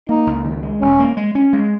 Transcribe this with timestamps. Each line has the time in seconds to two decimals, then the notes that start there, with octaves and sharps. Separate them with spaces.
0.09 A#3 D#4
0.27 C#2
0.44 D#3
0.63 G#3
0.81 E1 C#4
1.00 A#3
1.17 G#3
1.35 C#4
1.53 G#3